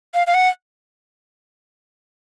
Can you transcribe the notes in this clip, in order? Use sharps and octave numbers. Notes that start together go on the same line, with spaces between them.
F5
F5
F#5